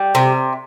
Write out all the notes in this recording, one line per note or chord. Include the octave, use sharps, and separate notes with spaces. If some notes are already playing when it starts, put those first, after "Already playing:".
Already playing: G3
C3